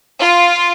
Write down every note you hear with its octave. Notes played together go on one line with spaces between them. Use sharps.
F4